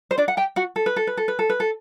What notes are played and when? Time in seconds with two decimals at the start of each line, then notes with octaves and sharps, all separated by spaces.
0.11 C5
0.18 D4 D5
0.28 F#5
0.37 G4 G5
0.56 F#4 F#5
0.76 A4
0.86 B4
0.96 A4
1.07 B4
1.17 A4
1.28 B4
1.39 A4
1.50 B4
1.60 A4